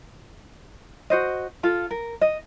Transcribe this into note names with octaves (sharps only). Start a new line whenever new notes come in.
F#4 C5 D#5
F4 A4
A#4
D#5